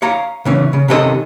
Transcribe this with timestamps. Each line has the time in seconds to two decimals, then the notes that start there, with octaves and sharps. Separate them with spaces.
0.02 C#5 F5 A#5
0.45 C#3 E3 C#4
0.73 C#3
0.88 C3 D#3 C#4 E4 A4 D#5